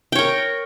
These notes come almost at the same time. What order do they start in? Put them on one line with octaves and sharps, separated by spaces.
G5 C#5 A#4